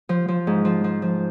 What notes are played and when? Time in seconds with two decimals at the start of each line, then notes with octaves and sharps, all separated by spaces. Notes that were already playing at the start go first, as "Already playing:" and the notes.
0.09 F3
0.28 F3
0.47 G#2
0.65 F3
0.84 F3
1.02 F3